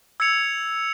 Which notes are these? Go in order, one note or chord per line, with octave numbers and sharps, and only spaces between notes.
E6 G#6 C#7 F7